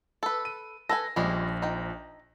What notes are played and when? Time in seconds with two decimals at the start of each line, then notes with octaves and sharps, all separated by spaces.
0.23 A4 B4
0.45 D#7
0.89 A4 B4 G#5 A#6
1.16 A#1 F3 G3 G#3 C#4
1.62 D#4 G5